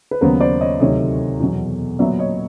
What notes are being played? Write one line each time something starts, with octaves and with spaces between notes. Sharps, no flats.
B4
D#2 C#3 F#3 B3 A#4 C5
C5 D5
C#5 D#5
D2 C3 D#3 F#3 C#5 D#5
E2 B2 F#3
A#2 F#3 B3 D5 E5
C#5 D#5